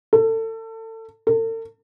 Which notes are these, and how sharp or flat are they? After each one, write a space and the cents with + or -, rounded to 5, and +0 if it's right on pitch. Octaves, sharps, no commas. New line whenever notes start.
A4 +30
A4 +45